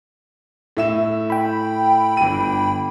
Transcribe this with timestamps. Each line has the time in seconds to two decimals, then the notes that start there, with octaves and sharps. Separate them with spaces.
0.77 A2 E5 E7
1.30 G5 B5
2.17 G1 D#7